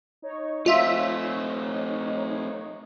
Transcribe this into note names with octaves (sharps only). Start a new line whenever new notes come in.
D#4 C#5
A3 C4 F4 E5